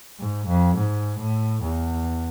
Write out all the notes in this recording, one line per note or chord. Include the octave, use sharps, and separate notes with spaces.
G#2
F2
G#2
A2
E2